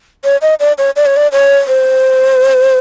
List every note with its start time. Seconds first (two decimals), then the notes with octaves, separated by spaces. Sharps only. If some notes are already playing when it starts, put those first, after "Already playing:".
0.24 C#5
0.42 D#5
0.60 D5
0.78 C#5
0.96 D5
1.06 C#5
1.16 D5
1.32 C#5
1.68 C5